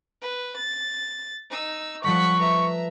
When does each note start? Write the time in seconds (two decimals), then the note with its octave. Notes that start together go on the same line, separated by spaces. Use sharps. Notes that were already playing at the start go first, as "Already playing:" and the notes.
0.22 B4
0.56 A6
1.50 D#4 E6
2.04 F3 G3 A3 F#5 C#6 B6
2.39 B4 E5 A#5